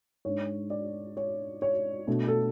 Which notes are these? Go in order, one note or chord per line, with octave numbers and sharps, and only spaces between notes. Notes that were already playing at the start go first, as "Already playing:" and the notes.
G#2 G#3 D4 C#5
D5
C#5
C#5
B2 A3 D4
A4